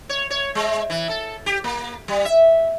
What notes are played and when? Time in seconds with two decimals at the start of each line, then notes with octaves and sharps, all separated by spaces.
0.09 C#5
0.30 C#5
0.55 G#3
0.90 E3
1.09 A4
1.46 G4
1.64 A#3
2.08 G3
2.25 E5